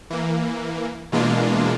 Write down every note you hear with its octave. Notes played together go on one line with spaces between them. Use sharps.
E3 A#3
B2 E3 G#3 A#3 D4 F4